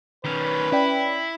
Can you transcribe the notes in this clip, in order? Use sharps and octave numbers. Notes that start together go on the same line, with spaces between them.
D#3 C#4 B4
C#4 E4 D5 G5